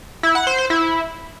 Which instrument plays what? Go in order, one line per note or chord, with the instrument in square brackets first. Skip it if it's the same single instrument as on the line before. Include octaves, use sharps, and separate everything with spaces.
[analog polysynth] E4
F#5
C5
C5
E4